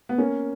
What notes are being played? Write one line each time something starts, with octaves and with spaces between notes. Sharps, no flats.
B3
A#3 C#4